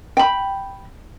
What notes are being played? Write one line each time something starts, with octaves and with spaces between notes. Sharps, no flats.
G5 B5